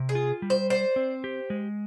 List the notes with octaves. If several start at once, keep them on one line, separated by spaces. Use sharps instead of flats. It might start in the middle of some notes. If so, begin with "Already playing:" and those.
Already playing: C3
G#4
F4
G3
C5
C5 D5
C4
G4
G#3